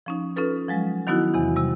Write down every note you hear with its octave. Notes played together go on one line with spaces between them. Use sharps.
F3 C#4 D#4
C#4 D#4 F4 A4 B4
F3 F#3 G#3
D#3 F#3 B3 D#4 E4 F#4
E2 C3 E3
C3 G3